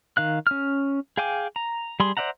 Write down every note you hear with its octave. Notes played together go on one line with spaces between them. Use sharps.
D#3 F5 F#6
C#4 F6
G#4 F5 G5 G#5 D6
A#5
G3 G#4 C6
C5 D5 E5 F#5 A#5